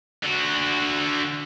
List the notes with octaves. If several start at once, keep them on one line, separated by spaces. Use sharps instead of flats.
D3 F#4